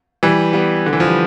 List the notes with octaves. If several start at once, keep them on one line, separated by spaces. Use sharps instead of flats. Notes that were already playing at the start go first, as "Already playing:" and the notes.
E3 G3
G3 B3
D3
E3
F3
G3